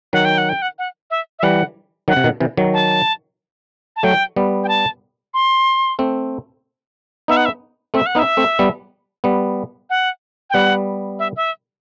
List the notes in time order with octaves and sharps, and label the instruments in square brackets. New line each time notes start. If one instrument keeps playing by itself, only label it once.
[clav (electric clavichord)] D#3 F#3 [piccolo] F#5
[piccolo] G5
F#5
G5
F#5
F#5
E5
E5
[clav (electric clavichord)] E3 G3 [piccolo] F#5
[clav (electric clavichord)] D#3 F#3 [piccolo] F#5
[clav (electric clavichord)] C3
B2 D#3
C3 E3
D#3 F#3
[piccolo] A5
A5
[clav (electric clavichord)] F#3 A3 [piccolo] G5
[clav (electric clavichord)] G3 B3
[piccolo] G5
A5
C6
[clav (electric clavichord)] A3 C4
[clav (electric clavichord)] B3 D#4 [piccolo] E5
[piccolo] F#5
E5
[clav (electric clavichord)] A3 C4 [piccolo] E5
[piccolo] F#5
[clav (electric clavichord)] B3 D#4 [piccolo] E5
[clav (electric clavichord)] A3 C4
G3 B3
G3 B3
[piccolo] F#5
G5
[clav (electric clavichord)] G3 B3 [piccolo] F#5
[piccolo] E5
E5